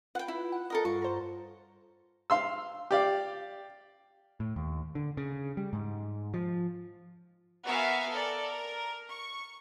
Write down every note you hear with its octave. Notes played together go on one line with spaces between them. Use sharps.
F4 B4 F#5 G5
E4
F#5
A4 A#4 D#5
G2 F4 C#6
C5 A#5
F5 C6 E6
G4 D5 F5
A2
D#2
D3
C#3
G3
G#2
F3
B3 F#4 A#4 E5 F5 G#5
A4 A#4 D5
A#4
C#6